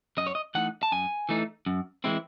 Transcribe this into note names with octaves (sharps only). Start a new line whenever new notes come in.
F#2 D#5
C#5
D#5
E3 A3 D#4 F#5
A5
F#2 G#5
E3 A3 D#4
F#2
E3 G#3 C4 E4